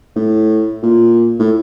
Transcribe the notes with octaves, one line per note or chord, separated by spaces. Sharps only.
A2
A#2
A2